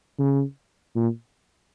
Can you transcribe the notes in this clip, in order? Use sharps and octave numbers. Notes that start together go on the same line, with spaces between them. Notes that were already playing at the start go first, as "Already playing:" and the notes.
C#3
A#2